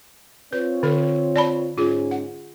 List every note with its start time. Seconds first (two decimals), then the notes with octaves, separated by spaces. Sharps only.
0.53 C4 F4 B4 C#5
0.83 D3 A4
1.36 D5 A5 B5
1.78 G#2 C#4 F4 G#4
2.11 F#5